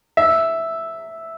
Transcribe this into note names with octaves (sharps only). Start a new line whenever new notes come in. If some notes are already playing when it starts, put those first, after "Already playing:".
E5